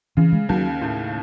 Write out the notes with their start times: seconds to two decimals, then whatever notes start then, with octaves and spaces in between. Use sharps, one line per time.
0.17 C#3 E3
0.32 G#3
0.49 D#2 F#3
0.81 A2